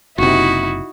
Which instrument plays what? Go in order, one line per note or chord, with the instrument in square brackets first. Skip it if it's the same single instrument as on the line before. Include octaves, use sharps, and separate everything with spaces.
[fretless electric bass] F#1 C3 [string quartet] D#4 E4 F#4